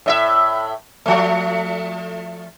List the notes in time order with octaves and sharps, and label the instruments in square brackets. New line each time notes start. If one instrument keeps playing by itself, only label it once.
[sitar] A2 D#5 E5
F3 A3